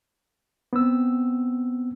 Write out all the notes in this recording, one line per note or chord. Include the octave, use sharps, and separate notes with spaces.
B3 C4 E6